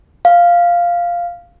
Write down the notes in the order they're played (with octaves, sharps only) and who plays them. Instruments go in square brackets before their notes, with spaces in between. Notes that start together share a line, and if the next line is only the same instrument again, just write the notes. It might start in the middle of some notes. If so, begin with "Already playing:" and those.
[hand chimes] F5